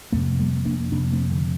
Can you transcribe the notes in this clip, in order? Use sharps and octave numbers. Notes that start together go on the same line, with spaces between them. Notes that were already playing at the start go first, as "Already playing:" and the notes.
F2 C3 A3 C4
G3 A#3
A#3 D4
F2 C3 A#3 D4
A3 C4
D3